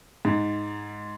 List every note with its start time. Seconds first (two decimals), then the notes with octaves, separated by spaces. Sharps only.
0.25 G#2